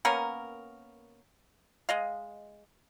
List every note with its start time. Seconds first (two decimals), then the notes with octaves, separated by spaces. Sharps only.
0.05 A#3 B3 C#4 A#4
1.89 G#3 D#5 F5